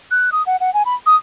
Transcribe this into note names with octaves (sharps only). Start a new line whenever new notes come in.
F#6
D#6
F#5
F#5
G#5
B5
D#6